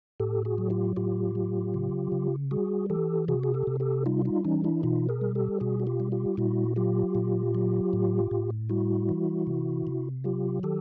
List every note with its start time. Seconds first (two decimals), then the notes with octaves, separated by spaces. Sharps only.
0.20 A2 G4 A4
0.45 F#4 G#4
0.58 F#3
0.70 F4 G4
0.96 A2 F4 G4
1.35 F#3
1.74 C#3
2.12 C#3
2.51 G3 F#4 G#4
2.90 E3 G4 A4
3.28 C3 F#4 G#4
3.43 G#4
3.54 G4 A4
3.67 C3
3.80 G4 A4
4.06 G3 D#4 F4
4.25 D#4 F4
4.45 E3 C#4 D#4
4.64 D4 E4
4.83 B2 D#4 F4
5.09 G#4 A#4
5.21 G3
5.35 G4 A4
5.60 B2 F#4 G#4
5.80 F#4
5.87 F4 G4
6.00 G3
6.12 F4 G4
6.37 A#2 E4 F#4
6.76 F#3 F4 G4
7.15 A#2
7.55 F#3
7.93 A2
8.31 A2
8.69 G3 E4 F#4
9.09 E3
9.47 C3
9.87 C3
10.24 F#3 F4 G4
10.63 D#3 G4 A4